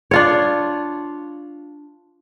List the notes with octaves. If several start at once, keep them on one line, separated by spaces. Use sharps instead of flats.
D4 F4 C#5